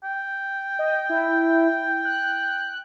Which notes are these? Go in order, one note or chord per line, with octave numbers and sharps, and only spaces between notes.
G5
D#5
E4
F#6